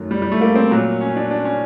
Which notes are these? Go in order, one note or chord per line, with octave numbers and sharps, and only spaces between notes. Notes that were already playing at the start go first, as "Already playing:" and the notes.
Already playing: F#2 D#3 F#3 A3
G3
G3
A3
A#3
C4
A#2 F#3
C#4
D4
D4
C#4